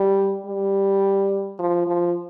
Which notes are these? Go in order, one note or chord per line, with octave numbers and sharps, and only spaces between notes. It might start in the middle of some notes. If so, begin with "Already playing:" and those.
Already playing: G3
G3
F3
F3